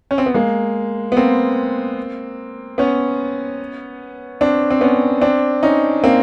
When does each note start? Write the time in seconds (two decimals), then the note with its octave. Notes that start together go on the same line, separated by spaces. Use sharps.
0.11 C#4
0.18 C4
0.26 B3
0.34 G#3 A#3
1.12 B3
1.17 A#3 C4
2.78 B3 C#4
4.41 C4 D4
4.70 C4
4.81 B3 C#4
5.21 C4 D4
5.63 C#4 D#4
6.04 A#3 C4